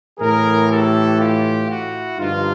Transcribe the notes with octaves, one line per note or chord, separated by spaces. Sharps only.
A2 E3 G#4 A#4
G4 A4
F4 G4
E4 F#4
G2 D3 F3 D#4 F4